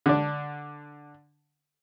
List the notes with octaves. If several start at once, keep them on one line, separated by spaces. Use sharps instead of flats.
D3 D4